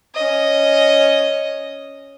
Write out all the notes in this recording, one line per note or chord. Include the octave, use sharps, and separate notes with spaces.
C#4 D#5